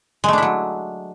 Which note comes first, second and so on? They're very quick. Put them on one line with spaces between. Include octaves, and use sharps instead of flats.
G#3 A3 D4 E4 F#3